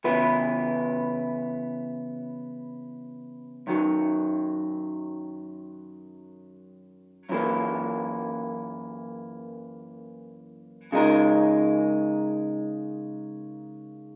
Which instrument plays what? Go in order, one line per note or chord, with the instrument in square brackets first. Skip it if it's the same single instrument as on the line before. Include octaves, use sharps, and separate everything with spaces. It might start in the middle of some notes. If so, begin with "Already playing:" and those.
[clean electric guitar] C#3 E3 B3 E4 B4
F#2 D#3 F#3
F#2 E3 A#3
C#3 G#3 D#4 A#4